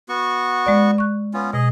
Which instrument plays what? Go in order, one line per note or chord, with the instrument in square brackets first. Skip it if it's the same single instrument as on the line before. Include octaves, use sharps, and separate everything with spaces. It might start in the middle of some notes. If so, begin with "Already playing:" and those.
[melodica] B3 F#4 C#6
[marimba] G#3 D5
C#6 F#6
[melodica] B3 C#4 F4
[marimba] B2 [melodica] G#4 D#5